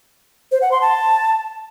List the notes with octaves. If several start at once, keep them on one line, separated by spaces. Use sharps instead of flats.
C5
F#5
C6
A5